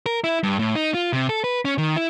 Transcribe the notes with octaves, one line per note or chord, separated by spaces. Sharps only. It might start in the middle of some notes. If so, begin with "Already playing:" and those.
A#4
E4
G2
A2
D#4
F4
C3
A4
B4
C#4
D#3
E4